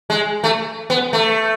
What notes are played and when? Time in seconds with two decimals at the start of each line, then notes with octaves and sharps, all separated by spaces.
0.10 G#3
0.44 A3
0.90 B3
1.13 A3